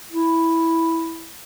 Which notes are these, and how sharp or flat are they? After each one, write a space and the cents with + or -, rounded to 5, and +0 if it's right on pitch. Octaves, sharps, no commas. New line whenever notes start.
E4 -5